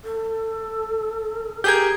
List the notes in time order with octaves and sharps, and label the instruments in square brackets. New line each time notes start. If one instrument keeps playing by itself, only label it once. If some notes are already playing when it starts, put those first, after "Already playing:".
[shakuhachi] A4
[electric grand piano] G4 G#4 A#4 [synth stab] G6 G#6